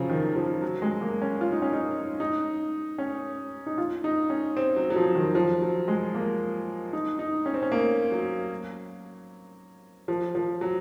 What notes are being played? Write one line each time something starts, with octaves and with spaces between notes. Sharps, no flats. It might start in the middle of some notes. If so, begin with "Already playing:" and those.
Already playing: C#3 F3 F#3
D#3
F3
F#3
G#3
A#3
C#4
F4
D#4
C#4
D#4
D#4
C#4
D#4
F4
D#4
C#4
C4
F#3
F#3
F3
D#3
F3
F#3
G#3
A#3
D#4
D#4
C#4
C4
C#4
A#3
F#3
F3
F3
F#3